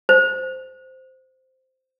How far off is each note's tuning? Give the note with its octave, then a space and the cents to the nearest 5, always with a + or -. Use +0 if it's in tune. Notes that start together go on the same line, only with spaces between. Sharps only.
C5 -10